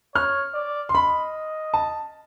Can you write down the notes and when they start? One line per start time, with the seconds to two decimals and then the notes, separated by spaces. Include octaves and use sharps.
0.15 C#5 F6
0.54 D5
0.89 C6
0.94 D#5 B5
1.74 A5